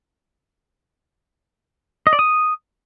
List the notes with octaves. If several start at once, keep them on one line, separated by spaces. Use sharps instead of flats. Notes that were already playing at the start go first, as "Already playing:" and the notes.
D#5
D5
D#6